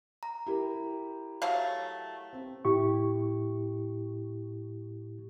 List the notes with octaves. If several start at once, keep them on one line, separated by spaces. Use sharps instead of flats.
A#5
E4 G4 A#4
F#3 A3 F5
C4
A2 E4 G4 C#6